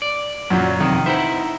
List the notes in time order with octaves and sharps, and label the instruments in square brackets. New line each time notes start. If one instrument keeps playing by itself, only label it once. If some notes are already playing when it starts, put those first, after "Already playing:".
[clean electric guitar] D5
[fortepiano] F#2 A#2 F#3
[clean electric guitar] F2 C3 [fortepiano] D#3
[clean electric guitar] D#4 E4 E5 [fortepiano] C5 F#5